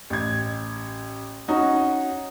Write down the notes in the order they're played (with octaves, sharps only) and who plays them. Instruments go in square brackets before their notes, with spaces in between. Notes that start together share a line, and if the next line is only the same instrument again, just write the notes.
[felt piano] A1 G#6
C#4 D#4 F#4